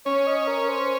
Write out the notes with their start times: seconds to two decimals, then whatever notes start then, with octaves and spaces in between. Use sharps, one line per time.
0.05 C#4 C#5
0.27 D#5
0.47 A#4
0.69 C5